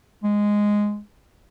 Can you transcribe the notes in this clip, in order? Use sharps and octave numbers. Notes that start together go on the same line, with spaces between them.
G#3